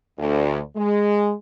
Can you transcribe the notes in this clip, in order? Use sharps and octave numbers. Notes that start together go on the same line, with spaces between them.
D2
G#3